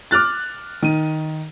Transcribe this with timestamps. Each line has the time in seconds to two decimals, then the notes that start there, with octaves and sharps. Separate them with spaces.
0.11 D6 F6 F#6 A6
0.83 D#3 D#7